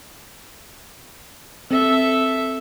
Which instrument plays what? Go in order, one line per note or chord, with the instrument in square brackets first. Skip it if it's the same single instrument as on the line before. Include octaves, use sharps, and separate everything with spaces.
[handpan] C4 [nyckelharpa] A4 E5